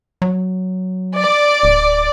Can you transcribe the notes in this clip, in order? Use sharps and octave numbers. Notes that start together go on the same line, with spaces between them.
F#3
D5
D1